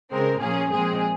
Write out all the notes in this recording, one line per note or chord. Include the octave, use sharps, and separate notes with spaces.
C#3 G#3 C4 A#4
A#2 F3 A#3 C#4 G#4
A#2 F3 G#3 C4 G#4